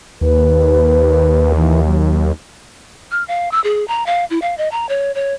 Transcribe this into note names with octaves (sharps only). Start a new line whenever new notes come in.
D#2 B4
E3
F#3
F6
F5
E6
G#4
A#5
F5
E4
F5
D#5
A#5
C#5
C#5